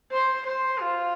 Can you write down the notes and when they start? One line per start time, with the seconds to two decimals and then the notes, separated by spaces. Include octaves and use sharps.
0.12 C5
0.46 C5
0.80 F4